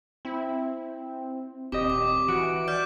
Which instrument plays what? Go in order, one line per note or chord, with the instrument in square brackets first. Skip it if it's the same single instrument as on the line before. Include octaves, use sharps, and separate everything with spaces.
[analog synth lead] C4 [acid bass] E4
[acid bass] D#1 [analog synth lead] C4 [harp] G4 D#5 [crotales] D6
[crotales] D6
[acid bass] E3 [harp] F#4 [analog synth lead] D7
[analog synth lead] D5 [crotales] D6 F6 G6